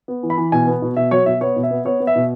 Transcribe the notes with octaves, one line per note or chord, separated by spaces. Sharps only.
B3
E3
B5
E3
B2 G#5
B3
B2
B2 E5
F#3 C#5
B2 E5
B3 C#5
B2
E5
B3
B3 C#5
B3
E5
B2